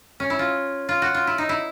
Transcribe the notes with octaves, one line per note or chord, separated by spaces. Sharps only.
C#4
E4
F4
F4
F#4
F4
E4
D#4
E4